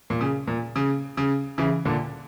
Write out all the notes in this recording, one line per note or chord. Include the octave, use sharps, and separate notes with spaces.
A#2
C#3
A#2
C#3
C#3
C#3 E3
A#2 D3